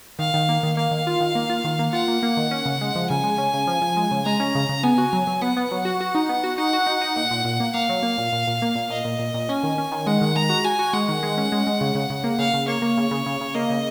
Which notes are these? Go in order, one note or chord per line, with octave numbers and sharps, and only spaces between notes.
D#3 F5
D#3
A#3
D#3
A#3 F5
D#3
F4
D#3
A#3
F4
D#3
A#3
F4 F#5
A#3
A#3
D#3
C#4
C#3
G#3
F3
C#3 G#5
G#3
C#4
C#3
F3
F3
G#3
C#3
G#3 A#5
C#4
C#3
C#3
B3 G#5
F#4
F#3
F#3
B3 F#5
B3
F#3
F#4
F#4
D#4
B3
F#4
D#4 F#5
F#4
D#4
D#4
A#2
A#2
A#2
A#3
A#3 F5
F#3
A#3
A#2
A#2
A#2
A#3
A#2
A#2 D#5
A#2
A#2
A#2
C#4 G#5
D#3
C#4
D#3
G#3 F#5
D#3
G#3 A#5
F#4
F#4 G#5
F#4
G#3 F#5
D#3
G#3
C#4
G#3
G#3
C#3
C#3
C#3
A#3
C#3 F5
C#3
A#3 C#5
A#3
C#3
C#3
C#3
C#3
A#3 D#5
C#3